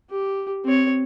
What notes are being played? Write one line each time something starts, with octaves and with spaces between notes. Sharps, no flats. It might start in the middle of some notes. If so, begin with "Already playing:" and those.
G4
C4 C#5